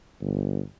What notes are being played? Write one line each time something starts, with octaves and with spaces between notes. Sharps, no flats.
G1